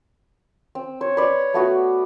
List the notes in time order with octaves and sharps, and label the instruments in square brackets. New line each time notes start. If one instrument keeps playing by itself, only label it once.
[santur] C4
[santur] C5 [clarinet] C#5
[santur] B4 D5
A3 B3 F#4